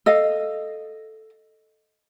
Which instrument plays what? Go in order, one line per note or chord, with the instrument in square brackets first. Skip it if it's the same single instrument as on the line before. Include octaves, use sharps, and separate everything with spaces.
[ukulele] A4 D#5 F5